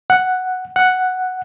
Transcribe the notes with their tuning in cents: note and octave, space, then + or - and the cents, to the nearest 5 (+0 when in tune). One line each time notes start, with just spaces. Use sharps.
F#5 +0
F#5 +0